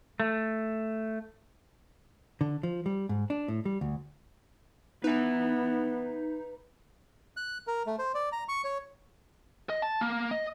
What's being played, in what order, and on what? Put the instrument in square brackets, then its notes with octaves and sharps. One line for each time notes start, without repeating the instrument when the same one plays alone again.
[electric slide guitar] A3
[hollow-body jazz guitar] D3
F3
G3
G#2
D4
A2
G3
D2
[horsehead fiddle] B3 [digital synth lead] D#4 [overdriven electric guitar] B4 E5
[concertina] F#6
A#4
A3
C5
D5
A#5
C#6
C#5
[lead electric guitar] D#5
A5
A#3
D#5